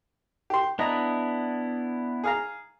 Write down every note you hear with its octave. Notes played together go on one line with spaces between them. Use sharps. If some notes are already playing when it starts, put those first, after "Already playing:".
G4 C6
B3 D4 E4 D#5 A#5
G#4 F5 A#5